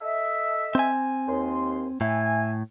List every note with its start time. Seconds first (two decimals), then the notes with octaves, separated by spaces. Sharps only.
0.02 A4 D#5 E5
0.75 C4 G#5
1.27 D#2 C6
2.01 A2 E5 G#5